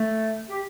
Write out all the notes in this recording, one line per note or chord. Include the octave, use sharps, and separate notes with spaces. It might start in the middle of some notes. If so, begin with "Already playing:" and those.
Already playing: A3
G4